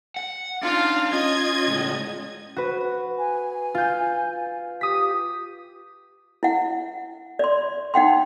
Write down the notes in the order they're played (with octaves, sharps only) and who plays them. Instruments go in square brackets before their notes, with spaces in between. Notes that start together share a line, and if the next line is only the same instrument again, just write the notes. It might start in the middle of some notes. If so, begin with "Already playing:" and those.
[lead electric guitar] F#5
[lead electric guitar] D4 D#4 [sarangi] F4 [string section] F5
[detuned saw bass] C#4 [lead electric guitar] F4 [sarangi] D#5 [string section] G#6
[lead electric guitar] C#2 A2
[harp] F#4 B4
[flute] G#5
[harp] F4 G6
[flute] G4 [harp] D#6 B6
[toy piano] E4 F#5
D5 C6
D#4 F#5 G5 C6